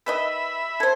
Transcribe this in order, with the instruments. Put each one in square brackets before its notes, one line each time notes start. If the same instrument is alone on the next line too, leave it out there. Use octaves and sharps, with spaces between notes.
[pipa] D#3 B4 D#5 [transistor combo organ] E5 B5
[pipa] A4 C5 [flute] G#6